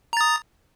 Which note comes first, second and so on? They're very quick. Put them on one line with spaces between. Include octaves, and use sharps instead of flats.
A#5 A6 D#6